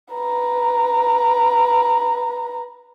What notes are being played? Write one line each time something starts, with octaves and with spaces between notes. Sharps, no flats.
B4 A#5